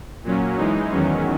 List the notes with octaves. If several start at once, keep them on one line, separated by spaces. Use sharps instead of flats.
A#2 F#3 C#4
E3 G#3 D#4
E2 D#3 F#3 C#4